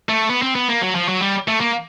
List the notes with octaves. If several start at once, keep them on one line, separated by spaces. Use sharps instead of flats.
A3
B3
C4
B3
A#3
F#3
F3
F#3
G3
A3
A#3